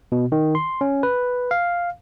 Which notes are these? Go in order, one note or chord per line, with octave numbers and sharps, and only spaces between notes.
B2
D#3
C6
C#4
B4
F5